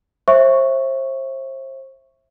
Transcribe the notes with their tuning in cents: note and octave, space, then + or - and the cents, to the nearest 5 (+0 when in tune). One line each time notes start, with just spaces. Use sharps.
C5 +35 E5 +0 C#6 +0